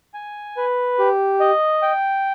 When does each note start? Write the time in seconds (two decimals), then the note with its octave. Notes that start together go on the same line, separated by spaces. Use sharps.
0.14 G#5
0.57 B4
0.99 G4
1.40 D#5
1.82 G5